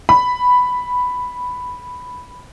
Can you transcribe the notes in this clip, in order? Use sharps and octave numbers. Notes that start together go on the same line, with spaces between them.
B5